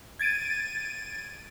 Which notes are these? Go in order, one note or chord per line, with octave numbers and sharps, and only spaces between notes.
G#6 A6 D7 D#7